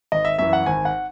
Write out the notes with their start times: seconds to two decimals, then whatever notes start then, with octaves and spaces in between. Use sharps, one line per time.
0.12 G#1 D#5
0.25 E5
0.38 F#2 E3 E5
0.53 F#5
0.66 G#1 G#5
0.85 F#5